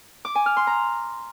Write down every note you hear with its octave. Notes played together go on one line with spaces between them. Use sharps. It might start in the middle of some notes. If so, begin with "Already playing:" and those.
D6
G#5
F6
C6
A#5